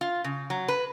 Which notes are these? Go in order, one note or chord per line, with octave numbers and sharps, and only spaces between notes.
F4
C#3
F#3
B4